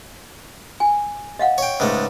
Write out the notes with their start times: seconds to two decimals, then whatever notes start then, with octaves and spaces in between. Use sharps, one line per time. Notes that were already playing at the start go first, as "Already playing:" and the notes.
0.80 G#5
1.39 D#5 F5 F#5
1.58 C#5 G5
1.80 C#2 G#2 A3